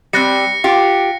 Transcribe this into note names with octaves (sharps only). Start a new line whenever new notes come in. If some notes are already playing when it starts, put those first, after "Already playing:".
G3 C4 F#6 A#6 C#7
F4 G4